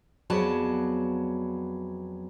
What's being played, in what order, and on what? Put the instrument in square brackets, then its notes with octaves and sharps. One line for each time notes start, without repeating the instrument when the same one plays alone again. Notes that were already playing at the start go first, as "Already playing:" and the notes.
[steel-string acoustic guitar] F2 F#3 B3 G#4 D5 A5